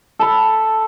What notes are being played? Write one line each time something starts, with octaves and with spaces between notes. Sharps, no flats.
A4 A5 B5